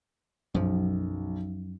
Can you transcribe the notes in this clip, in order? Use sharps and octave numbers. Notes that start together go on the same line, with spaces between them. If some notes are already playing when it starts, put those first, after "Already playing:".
B1 F#2 F3